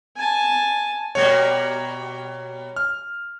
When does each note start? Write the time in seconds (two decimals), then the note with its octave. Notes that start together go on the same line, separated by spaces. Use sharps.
0.16 G#5 A5
1.15 B2 G3 A#3 C#5
2.76 F6